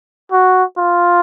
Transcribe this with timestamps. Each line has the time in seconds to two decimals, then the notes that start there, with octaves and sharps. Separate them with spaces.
0.32 F#4
0.78 F4